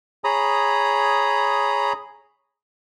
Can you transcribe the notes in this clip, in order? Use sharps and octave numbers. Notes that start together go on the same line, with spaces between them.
G#4 C#5 A#5 B5 D#6